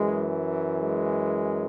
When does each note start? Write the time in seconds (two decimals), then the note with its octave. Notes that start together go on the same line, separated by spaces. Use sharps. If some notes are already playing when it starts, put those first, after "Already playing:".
Already playing: F#2 E3 G#3
0.79 G#3